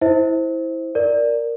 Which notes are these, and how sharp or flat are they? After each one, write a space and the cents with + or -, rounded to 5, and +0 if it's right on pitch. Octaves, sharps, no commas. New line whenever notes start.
E4 -15 C5 +0 E5 -45
A#4 +0 D5 +0